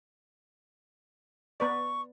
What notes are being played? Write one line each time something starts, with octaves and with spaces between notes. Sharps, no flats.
B3 B4 D5 C#6